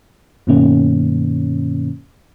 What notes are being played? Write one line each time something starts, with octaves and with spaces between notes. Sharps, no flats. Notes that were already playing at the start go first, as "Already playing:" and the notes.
G2 B2 D#3 A#3 C#4